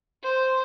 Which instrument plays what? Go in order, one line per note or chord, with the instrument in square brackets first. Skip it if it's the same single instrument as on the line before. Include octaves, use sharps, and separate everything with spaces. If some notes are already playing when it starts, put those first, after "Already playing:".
[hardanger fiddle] C5